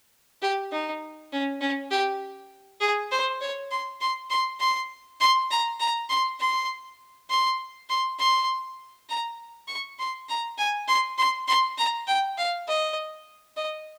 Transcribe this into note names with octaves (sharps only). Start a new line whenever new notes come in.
G4
D#4
C#4
C#4
G4
G#4
C5
C#5
C6
C6
C6
C6
C6
A#5
A#5
C6
C6
C6
C6
C6
A#5
C#6
C6
A#5
G#5
C6
C6
C6
A#5
G5
F5
D#5
D#5